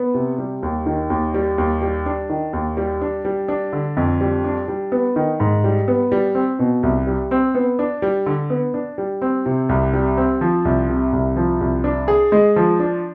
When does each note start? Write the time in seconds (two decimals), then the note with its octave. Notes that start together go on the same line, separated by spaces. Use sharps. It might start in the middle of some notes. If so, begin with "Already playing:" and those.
Already playing: B3
0.14 C3
0.38 G3
0.63 D#2
0.86 D#3
1.10 D#2
1.34 G3
1.58 D#2
1.82 G3
2.06 D4
2.30 D#3
2.53 D#2
2.77 G3
3.01 D4
3.25 G3
3.48 D4
3.73 D3
3.97 F2
4.21 G3
4.44 D4
4.68 G3
4.92 B3
5.16 D#3
5.40 G#2
5.64 G3
5.88 B3
6.12 G3
6.35 C4
6.59 B2
6.83 C2
7.07 G3
7.31 C4
7.55 B3
7.79 D4
8.02 G3
8.26 D3
8.50 B3
8.74 D4
8.98 G3
9.22 C4
9.46 C3
9.69 C2
9.93 G3
10.17 C4
10.41 F3
10.65 C2
10.89 C3
11.13 C2
11.36 F3
11.61 C2
11.84 D4
12.08 G#4
12.32 G#3
12.56 F3
12.80 D4